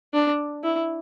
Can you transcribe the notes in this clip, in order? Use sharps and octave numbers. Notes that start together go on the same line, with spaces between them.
D4
E4